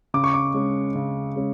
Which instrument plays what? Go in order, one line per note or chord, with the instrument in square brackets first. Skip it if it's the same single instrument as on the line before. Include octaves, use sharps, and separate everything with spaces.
[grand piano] C#3 D6
C#6
D6
G#3 C#4
C#3
G#3 C#4